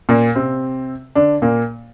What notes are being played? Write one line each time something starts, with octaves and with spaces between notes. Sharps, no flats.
A#2 A#3
C3 C4
D3 D4
A#2 A#3